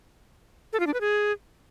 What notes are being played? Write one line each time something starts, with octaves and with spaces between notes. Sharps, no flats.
A4
F4
D4
B4
G#4